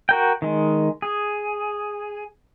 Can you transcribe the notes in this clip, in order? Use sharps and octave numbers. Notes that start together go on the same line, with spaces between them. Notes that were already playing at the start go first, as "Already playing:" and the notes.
F#4 A#4 G5
D#3 G#3
G#4